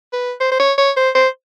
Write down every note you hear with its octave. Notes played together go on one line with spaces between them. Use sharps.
B4
C5
C5
C#5
C#5
C5
C5